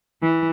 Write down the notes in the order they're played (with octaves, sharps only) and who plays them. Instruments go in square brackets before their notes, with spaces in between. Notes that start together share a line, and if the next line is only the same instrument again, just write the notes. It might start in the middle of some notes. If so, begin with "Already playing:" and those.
[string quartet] E3